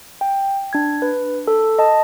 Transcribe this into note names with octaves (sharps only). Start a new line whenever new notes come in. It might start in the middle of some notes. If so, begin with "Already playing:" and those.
G5
D4 G#6
B4
A4
D#5 A5